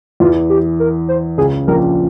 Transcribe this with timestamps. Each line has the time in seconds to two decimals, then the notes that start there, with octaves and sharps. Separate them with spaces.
0.20 E2 E3 F4
0.50 G4
0.80 A#4
1.08 C5
1.37 C#2 C#3 G#4
1.67 A#1 A#2 A#4